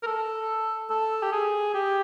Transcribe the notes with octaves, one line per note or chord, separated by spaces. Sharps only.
A#4
A4
A4
G4
G#4
G4